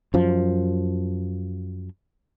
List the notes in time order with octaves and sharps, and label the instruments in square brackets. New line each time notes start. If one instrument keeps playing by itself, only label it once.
[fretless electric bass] F#2 F3